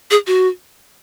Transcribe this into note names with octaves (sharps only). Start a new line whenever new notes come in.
G#4
F#4